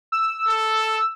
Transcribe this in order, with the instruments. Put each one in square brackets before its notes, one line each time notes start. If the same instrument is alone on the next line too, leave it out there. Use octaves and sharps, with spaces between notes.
[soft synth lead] E6
[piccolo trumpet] A4